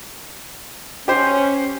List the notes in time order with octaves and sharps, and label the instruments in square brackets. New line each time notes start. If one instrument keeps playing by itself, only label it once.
[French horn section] C#4 [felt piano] G4 C5